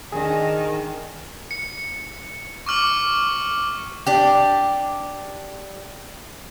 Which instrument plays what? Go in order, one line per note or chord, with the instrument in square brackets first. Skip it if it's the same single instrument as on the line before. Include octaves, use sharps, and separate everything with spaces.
[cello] D#3 [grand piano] D4 G#4
[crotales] C#7
C#6 D6 F6 F#7
[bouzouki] D4 G4